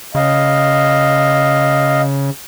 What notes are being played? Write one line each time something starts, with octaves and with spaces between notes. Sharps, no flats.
C#3 D#5 F5